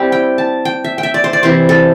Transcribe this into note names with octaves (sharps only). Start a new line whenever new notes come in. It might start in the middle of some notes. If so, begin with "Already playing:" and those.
Already playing: G3 C4 E4 G4
G5
A5
G5
E5
G5
E5
D5
C5
D5
C3 E3 C4 E4 C5
A4